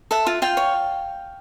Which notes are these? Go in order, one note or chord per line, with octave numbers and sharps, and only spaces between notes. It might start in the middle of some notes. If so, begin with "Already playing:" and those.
A4 E5 F#5
F4
F4 F5 G5
C#5